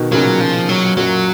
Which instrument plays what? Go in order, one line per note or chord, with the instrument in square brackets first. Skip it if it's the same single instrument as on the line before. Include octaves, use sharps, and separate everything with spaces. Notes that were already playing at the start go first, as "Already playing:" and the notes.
Already playing: [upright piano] B2 D#3
[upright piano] A#2 C#3 [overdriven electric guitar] F#3
[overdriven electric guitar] F3
F#3
[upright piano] F#2 A#2 [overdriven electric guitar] F#3